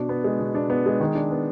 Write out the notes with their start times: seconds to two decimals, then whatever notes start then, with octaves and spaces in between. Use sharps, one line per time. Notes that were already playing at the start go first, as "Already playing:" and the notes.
Already playing: B2 D4
0.09 B3
0.24 G#3
0.40 B2
0.55 D4
0.70 B3
0.86 G#3
1.00 D#3
1.15 D4
1.31 B3